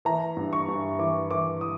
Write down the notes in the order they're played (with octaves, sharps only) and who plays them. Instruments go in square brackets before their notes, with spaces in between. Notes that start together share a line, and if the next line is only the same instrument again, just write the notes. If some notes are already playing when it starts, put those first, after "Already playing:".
[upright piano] E3 A#5
G2
C#6
G2
E3 D6
E3 D6
D#6